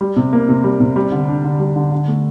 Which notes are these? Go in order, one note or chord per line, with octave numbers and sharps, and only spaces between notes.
G3
C3
A#3
C3
G3
C3
G3
D3
D4
D3
G3
D3
D3
A3